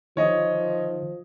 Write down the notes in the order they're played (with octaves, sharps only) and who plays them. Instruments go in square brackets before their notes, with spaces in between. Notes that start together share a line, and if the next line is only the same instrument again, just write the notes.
[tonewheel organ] D#3 [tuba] F3 [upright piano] C#5 D#5